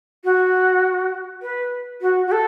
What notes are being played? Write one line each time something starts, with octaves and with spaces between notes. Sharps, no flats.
F#4
B4
F#4
F#4
A4